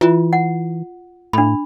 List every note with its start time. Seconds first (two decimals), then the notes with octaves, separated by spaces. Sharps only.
0.01 E3 F4
0.33 F#5
1.33 A2 D4 B5